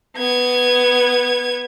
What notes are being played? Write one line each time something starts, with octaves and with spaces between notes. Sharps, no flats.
B3 G#6